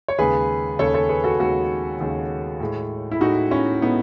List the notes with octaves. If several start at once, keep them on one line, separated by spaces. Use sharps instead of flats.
C#5
D#2 C#3 G#3 G#4 B4
D#2 C#3 G#3 A4 C#5
A4 C#5
G#4 B4
F#4 A4
D#2 C#3 G#3 F#4 A4
D#2 C#3 G#3
A2 G#3
E4
A2 G#3 D#4 F#4
C#4 E4
A2 G#3 B3 D#4